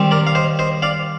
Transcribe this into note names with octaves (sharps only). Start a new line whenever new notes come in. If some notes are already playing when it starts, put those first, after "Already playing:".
Already playing: D#3 G3 C4
A#4 D5
F5
C5 D#5
C5 D#5
D5 F5